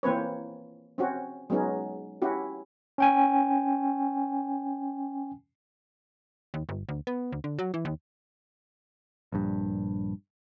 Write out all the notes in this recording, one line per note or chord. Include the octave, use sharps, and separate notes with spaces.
E3 A#3 C4 B4 C#5
C4 C#4 F#4
F#3 G#3 B3 C#4 D#4
C#4 E4 F#4 G4
C#4 G5 G#5
D#2
G1
D2
B3
D2
D3
F#3
E3
D#2
A#1 G2